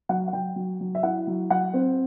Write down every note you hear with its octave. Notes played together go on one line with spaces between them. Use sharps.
F#3 F#5
F#5
F#3 G5
F#3
F#3
E5
E4 F#5
F#3
F#3 F#5
C4